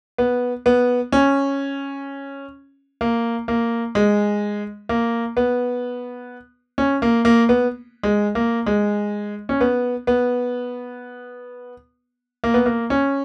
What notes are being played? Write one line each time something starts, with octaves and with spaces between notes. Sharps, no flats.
B3
B3
C#4
A#3
A#3
G#3
A#3
B3
C#4
A#3
A#3
B3
G#3
A#3
G#3
C#4
B3
B3
A#3
B3
A#3
C#4